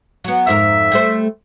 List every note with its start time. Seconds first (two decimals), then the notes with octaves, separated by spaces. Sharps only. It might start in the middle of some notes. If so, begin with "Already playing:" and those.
0.24 F#3 B3
0.47 F2 G#2 A#4 E5
0.92 G3 A3 C5